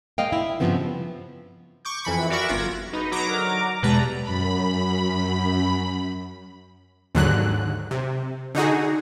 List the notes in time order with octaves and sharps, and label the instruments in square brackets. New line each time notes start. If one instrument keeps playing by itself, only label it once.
[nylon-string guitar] G#3 A#3 D#5 F5 G5
E4
G2 A#2 C#3 F3 B3 C4
[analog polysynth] C#6 D6 G6
F2 E3 B5 C#7
F#4 A#4 D5 E5 B5 C#6
G1 F4 D6 G#6 A#6
[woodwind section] C#2 B2 B5 [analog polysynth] D#4
[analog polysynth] F#3 A#5 D6
[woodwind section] D3 D#3 A#4
[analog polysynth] E2 B4 A#5 [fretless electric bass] B2 G#3 [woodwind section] G3 A5
[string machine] F#2 B5
[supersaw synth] D#2 G#2 D3 F#3 F#6
C3
D3 D#4 F#4 G#4